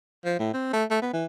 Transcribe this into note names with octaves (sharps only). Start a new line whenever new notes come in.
F3
A2
C4
A3
A3
B3
E3